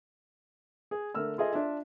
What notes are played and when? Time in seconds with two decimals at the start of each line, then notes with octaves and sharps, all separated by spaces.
0.91 G#4
1.15 D3 A3 A#4 E6 F6
1.38 F4 G#4 A4 D#5 E5
1.53 D4 F4 E5